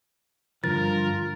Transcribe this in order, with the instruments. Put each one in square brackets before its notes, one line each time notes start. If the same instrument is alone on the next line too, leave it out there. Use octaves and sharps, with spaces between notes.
[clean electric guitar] G2 D3 F3 [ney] F4 [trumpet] A#4 [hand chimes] A6